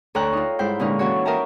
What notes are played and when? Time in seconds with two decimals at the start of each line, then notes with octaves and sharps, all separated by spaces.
0.15 D2 A4 C#5 G5 A#5 F#6
0.33 D#4 F4
0.59 G#2 G3 E4 C5 G5 G6
0.80 A#2 D3 G#3 C#4 D#4 A#4
0.99 E3 A#3 C#4 F#4 A4 C#5
1.25 A#4 D#5 E5 G5 A5 A#5